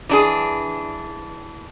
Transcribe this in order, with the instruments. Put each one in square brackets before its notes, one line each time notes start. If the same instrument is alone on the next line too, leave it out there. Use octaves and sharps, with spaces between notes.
[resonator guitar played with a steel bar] E3 D4 G#4